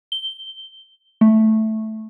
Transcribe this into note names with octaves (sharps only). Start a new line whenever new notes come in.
G7
A3